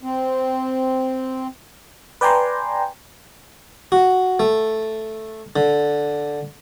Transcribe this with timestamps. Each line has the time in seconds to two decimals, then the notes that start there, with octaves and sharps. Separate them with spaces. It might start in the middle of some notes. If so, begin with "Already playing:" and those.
0.03 C4
2.21 B4 D5 G5 G#5 A#5 C6
3.92 F#4
4.40 A3
5.56 D3